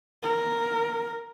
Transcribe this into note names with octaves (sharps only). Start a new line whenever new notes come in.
A#4